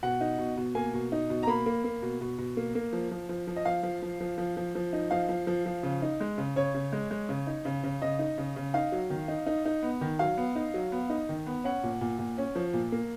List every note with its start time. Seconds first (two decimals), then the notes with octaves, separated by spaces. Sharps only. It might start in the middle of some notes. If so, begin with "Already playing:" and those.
0.03 B2 F#5
0.21 D#4
0.38 B2
0.57 B2
0.75 A#3 G#5
0.94 B2
1.12 D#4
1.30 B2
1.43 A#5
1.47 A#3 B5
1.66 A#3
1.84 A#3
2.02 B2
2.21 B2
2.38 B2
2.57 A#3
2.75 A#3
2.93 F3
3.11 F3
3.29 F3
3.47 F3
3.56 D#5
3.65 F3 F5
3.83 F3
4.02 F3
4.20 F3
4.38 F3
4.57 F3
4.75 F3
4.93 D#4
5.11 F3 F5
5.29 F3
5.47 F3
5.66 F3
5.83 C#3
6.02 D#4
6.20 G#3
6.38 C#3
6.56 C#3 C#5
6.74 C#3
6.93 G#3
7.11 G#3
7.29 C#3
7.47 D#4
7.65 C#3
7.84 C#3
8.02 C#3 D#5
8.19 D#4
8.38 C#3
8.56 C#3
8.74 D#4 F5
8.92 F#3
9.10 D#3
9.28 D#4
9.46 D#4
9.65 D#4
9.82 B3
10.01 D#3
10.19 F#3 F5
10.37 B3
10.56 D#4
10.74 F#3
10.92 B3
11.10 D#4
11.29 D#3
11.47 B3
11.64 C#4 F#5
11.83 A#2
12.01 A#2
12.19 A#2
12.38 C#4
12.55 F3
12.73 A#2
12.92 A#3